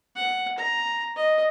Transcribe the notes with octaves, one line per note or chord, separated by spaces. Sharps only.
F#5
A#5
D#5